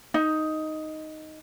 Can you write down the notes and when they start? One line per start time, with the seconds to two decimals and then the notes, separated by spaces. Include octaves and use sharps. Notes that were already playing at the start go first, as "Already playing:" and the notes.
0.14 D#4